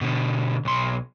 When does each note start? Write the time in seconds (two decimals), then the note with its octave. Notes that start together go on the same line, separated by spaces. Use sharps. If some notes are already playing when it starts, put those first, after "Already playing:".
0.01 B2 D3
0.65 B1 C6